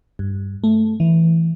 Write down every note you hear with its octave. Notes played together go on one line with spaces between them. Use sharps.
G2
A3
E3